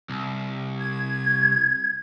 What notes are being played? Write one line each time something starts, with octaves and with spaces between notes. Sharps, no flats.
C2
G#6